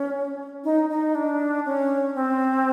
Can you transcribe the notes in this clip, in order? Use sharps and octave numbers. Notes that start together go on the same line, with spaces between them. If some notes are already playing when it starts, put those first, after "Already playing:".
Already playing: C#4
D#4
D#4
D4
C#4
C4